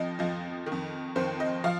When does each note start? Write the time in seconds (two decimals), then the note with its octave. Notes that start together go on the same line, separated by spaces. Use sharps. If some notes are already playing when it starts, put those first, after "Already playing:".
Already playing: F2 F3 D#5
0.19 F2 F3 D#5
0.66 D#3
0.72 F2
1.16 F2 D#3 C5
1.40 D#5
1.64 F3 F5